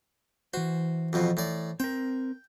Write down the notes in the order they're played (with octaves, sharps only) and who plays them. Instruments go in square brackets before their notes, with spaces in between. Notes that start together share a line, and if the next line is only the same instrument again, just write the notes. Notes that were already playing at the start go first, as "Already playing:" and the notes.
[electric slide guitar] E3 C5 [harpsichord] F#4
[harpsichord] F2 B2 F3
A2 D5
[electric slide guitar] C4 A#4 [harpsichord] G5